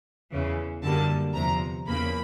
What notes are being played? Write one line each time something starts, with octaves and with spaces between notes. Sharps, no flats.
E2 C#3 E3
F#2 D3 G3 A#3 A5
E2 C3 F3 A#5
E2 C#3 F3 A#3 B5